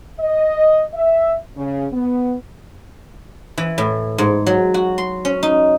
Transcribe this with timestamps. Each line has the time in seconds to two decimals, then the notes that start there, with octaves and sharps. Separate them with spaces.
0.19 D#5
0.94 E5
1.56 C#3
1.93 B3
3.58 E3
3.78 A2
4.18 G#2
4.46 F#3
4.74 F#4
4.98 C6
5.25 C#4
5.43 D#4